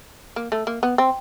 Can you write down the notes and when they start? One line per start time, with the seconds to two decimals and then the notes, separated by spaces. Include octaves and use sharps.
0.36 A#3
0.52 A3
0.67 A#3
0.83 B3
0.98 C4